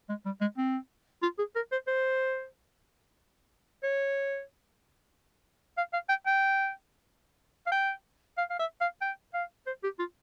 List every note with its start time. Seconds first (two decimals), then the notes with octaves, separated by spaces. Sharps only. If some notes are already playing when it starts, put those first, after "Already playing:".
0.09 G#3
0.25 G3
0.41 G#3
0.57 C4
1.22 F4
1.38 G#4
1.55 A#4
1.72 C5
1.87 C5
3.83 C#5
5.77 F5
5.93 F5
6.09 G5
6.26 G5
7.66 F5
7.72 G5
8.37 F5
8.50 F5
8.59 E5
8.81 F5
9.01 G5
9.33 F5
9.66 C5
9.83 G4
9.99 F4